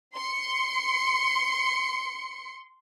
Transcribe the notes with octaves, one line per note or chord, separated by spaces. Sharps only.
C6 C#7